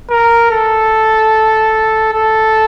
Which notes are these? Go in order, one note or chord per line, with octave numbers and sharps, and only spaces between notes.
A#4
A4
A4